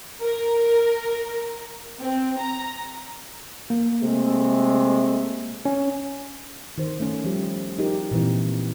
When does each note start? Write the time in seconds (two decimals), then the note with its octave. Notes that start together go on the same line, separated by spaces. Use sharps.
0.20 A#4
1.99 C4
2.39 A#5
3.70 A#3
4.03 C3 G#3 A3
5.65 C#4
6.78 D#3 C5
7.00 A3 C#4
7.25 F3 G3 G4
7.78 D#4 F4 G4 G#4 A#4
8.11 A#2 E3 C4